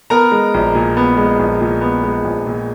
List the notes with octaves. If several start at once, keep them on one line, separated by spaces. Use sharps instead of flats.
B3 A#4 A#5
G#3
A#1
A#2
B3
G#3
A#1
A#2
B3
G#3
A#1
A#2